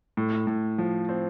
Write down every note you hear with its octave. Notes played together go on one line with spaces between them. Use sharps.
A2
A2
F3
C4